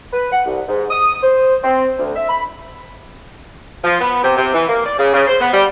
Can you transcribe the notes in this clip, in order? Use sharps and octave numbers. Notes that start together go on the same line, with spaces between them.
B4
F#5
C2
G#2
D#6
C5
C4
D2
E5
B5
F3
B3
C3
C3
E3
A#3
D5
C#3
C#3
C5
B3
G3